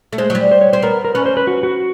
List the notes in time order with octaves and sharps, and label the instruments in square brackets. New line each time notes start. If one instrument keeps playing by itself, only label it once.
[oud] A3
[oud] G#3 [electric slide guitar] C5
[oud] F#3
G3
[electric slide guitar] C5
C#5
[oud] C4 [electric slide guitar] C5
[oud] B3 [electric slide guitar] A#4
[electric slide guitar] A#4
[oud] C#4 [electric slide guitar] B4
[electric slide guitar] C5
B4
F#4
F#4